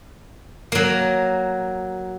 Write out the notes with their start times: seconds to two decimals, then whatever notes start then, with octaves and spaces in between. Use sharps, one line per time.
0.72 F#3 A#3